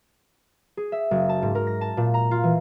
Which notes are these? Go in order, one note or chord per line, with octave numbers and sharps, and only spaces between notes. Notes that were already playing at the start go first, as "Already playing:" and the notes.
G#4
E5
F#1
A5
G#2
A#4
A#6
A5
A#2
A#5
F4
E3